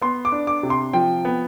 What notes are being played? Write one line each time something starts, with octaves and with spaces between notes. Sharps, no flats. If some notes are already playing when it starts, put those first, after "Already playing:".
B3 C6
D6
D4
D6
C3
C6
F3 G5
B3